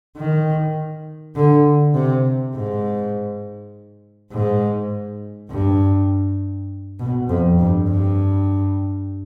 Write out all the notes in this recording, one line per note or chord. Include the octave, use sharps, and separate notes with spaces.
D#3
D3
C3
G#2
G#2
G2
B2
F2
G2
G2